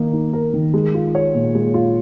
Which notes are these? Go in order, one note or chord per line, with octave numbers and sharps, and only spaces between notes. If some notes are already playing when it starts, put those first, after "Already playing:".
Already playing: D#3 A#3 D#4
D#4
A#4
D#3
G#3
F4
C#5
A#2
G#3
F4